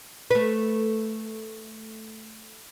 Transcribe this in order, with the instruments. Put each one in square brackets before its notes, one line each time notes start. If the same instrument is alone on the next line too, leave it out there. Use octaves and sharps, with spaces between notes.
[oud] A3 B4